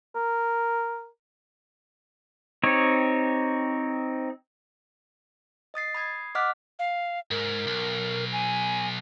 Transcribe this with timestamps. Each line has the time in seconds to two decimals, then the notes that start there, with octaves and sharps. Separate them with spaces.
0.15 A#4
2.63 C4 D#4 G4 C#5
5.74 D#5 D#6 A6 C7
5.95 B5 D#6 G#6 C7
6.35 D#5 F#5 D6 F6 F#6 B6
6.79 F5
7.31 G#2 A#4
7.67 B1
8.32 G#5